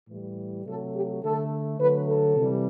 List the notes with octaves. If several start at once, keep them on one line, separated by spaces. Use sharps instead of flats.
A2 E3 G3
C3 F#3 A3 A4
G4
D3 A3 A4
D3 F#3 A3 B4
A4
C3 E3 G3